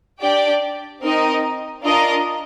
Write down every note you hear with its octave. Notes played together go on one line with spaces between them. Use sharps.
D4 G4 D5 G5
C4 D#4 A#4 D#5
D4 F4 A#4 D#5